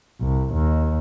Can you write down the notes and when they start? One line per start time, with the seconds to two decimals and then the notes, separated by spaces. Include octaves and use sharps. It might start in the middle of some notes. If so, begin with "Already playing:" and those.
0.21 C2
0.54 D#2